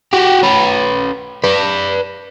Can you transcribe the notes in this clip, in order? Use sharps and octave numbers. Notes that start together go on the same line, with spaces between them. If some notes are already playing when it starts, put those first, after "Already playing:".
F#4 G4
C#4 B4
B4 D5